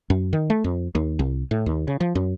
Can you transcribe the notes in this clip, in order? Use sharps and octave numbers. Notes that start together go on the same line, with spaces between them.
F#2
D#3
A3
F2
D#2
C2
A2
D#2
C#3
F3
F#2